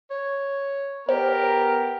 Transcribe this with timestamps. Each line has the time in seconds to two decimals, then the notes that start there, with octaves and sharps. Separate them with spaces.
0.11 C#5
1.09 B3 G4 A#4 C5